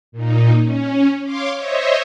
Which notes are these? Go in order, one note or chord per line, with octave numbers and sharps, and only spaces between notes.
A#2 D#4
C#4
C#5 F5 C6 D6
C5 C#5 D#5 E5